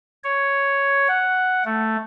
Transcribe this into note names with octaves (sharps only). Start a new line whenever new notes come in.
C#5
F#5
A3